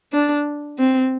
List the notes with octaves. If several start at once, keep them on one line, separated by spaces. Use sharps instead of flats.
D4
C4